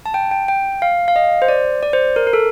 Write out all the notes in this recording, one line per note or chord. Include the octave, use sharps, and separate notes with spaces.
A5
G5
G5
G5
F5
F5
D#5
C5
D5
D5
C5
A#4
A#4
A4